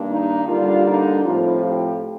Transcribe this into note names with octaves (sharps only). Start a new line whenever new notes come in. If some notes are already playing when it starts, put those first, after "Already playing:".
Already playing: G2 D#3 A#3 D4
D#4
D3 G3 A#3 D4 F4
D#4
A2 F3 C4 F4
G4